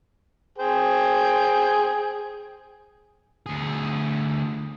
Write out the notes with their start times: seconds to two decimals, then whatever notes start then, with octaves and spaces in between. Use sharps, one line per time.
0.58 G#4 C5 G5
3.46 D2 G#4